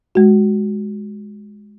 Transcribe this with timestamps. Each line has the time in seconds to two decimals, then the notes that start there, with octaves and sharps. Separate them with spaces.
0.15 G#3 F#4